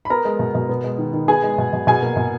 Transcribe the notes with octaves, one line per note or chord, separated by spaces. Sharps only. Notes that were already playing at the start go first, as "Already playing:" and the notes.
B5
B3 A#4 A#5
G#3
B2
B2
B3
G#3
D#3
D#3
B3 G#4 G#5
G#3
B2
B2
B2 G#4 G#5
A#3
B2